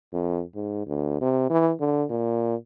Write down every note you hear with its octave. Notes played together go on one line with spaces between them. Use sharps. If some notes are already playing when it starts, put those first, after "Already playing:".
F2
G#2
D2
C3
E3
D3
A#2